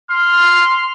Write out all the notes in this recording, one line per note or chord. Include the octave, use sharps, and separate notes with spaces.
C6 F6